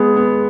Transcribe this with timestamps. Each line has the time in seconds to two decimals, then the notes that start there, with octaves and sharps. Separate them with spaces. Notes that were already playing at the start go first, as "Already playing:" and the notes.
Already playing: G#3 B3 G#4
0.16 B3